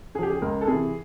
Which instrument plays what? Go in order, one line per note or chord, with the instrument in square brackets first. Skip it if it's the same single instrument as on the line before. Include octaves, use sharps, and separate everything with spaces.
[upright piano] C#3 G#4
F3 G4
G#4
C#2 A#4
A4
C3 E3 G#4